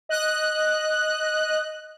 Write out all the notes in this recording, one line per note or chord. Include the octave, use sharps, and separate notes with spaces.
D#5 F#6